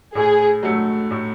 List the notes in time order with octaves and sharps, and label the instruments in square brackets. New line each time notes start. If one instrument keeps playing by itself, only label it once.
[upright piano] A2 [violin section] G#4
[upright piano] F#3 A3
A2